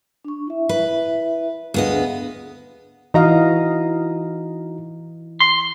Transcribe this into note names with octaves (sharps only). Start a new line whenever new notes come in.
D4 C#6
E4 E5
B4
D2 B3 D4 G#4 D#5 F5
E3 D#4 F#4 D#5 F5 A#5
C6